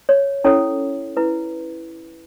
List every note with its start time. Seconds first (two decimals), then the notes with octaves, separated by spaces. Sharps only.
0.09 C#5
0.44 C#4 E4 A4 C#5
1.17 E4 B4